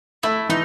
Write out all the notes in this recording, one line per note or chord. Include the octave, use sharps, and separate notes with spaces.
A3 E4
E3 D#4